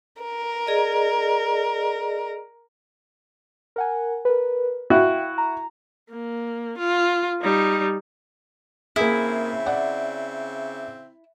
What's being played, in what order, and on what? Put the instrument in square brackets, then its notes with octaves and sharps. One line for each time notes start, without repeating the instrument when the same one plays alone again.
[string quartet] A#4
[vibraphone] G#4 D5 D#5
[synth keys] A#4 F#5 G#5
A#4 B4
[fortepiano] E4 F#4 [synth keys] F5 G5
[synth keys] A#5
[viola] A#3
F4
G3 D#4
[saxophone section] C#3 C4 E5 [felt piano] A#3 G#4 [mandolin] E4
[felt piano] D5 F#5